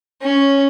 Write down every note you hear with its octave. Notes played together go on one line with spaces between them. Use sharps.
C#4